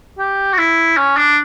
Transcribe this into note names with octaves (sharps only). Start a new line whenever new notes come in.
G4
F#4
E4
C#4
D4